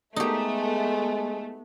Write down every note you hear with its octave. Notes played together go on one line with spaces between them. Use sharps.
G#3 A3 B3 D#4 G4